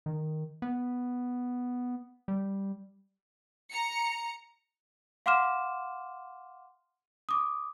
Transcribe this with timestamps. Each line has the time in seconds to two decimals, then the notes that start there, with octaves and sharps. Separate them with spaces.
0.06 D#3
0.62 B3
2.28 G3
3.71 A#5 C#7
5.26 F5 F#5 C6 D6 F6 E7
7.29 D6 D#6